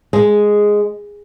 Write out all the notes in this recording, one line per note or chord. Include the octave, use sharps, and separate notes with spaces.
G#3